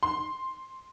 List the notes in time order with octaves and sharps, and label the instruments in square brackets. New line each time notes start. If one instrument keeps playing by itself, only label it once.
[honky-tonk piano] C6